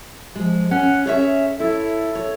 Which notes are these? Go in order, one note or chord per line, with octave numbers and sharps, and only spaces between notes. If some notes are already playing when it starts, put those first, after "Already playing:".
F3 G#3
C#4 F#5
C#4 G#4 C#5 E5
E4 A4 C#5
C#5